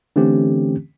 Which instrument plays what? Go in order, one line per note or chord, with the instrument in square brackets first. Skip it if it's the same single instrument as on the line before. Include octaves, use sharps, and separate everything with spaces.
[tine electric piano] D3 E3 A3 C4 C#4 G4